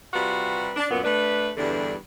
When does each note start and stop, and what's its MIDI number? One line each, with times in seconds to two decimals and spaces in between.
0.14 0.72 48
0.14 0.72 55
0.14 0.72 65
0.14 0.72 66
0.14 0.72 71
0.76 0.86 62
0.91 1.01 42
0.91 1.01 46
0.91 1.01 59
1.04 1.51 57
1.04 1.51 62
1.04 1.51 71
1.57 1.95 40
1.57 1.95 43
1.57 1.95 50
1.57 1.95 52
1.57 1.95 55
1.57 1.95 62